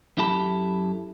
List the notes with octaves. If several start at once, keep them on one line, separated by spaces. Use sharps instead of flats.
F#2 E4 G4 A4 A5 B5